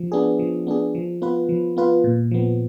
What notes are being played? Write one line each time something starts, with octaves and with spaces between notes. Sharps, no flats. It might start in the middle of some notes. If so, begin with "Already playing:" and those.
Already playing: F3
B3 D4 G#4
F3
B3 D4 G#4
F3
B3 F4 B4
F3
B3 F4 B4
A#2
F3 B3